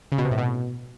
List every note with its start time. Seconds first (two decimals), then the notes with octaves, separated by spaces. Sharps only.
0.12 C#3
0.18 B2
0.25 C3
0.31 A2
0.38 B2